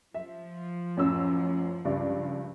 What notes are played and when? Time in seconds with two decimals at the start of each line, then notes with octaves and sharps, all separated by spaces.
0.14 F3 E5
0.97 A1 F#2 E6
1.85 C#2 G2 D5